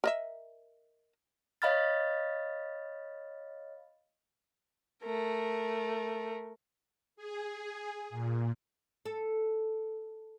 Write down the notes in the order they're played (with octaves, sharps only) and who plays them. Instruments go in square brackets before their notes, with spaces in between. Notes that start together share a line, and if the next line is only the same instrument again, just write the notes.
[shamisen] A#4 D#5 E5
[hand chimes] C#5 D#5 F5 B5 F6 A6
[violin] A3 A#4
[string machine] G#4
A#2
[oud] A4